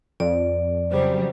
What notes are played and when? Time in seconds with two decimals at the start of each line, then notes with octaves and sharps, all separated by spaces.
0.20 F2 D5
0.92 C#3 F#3 G3 C5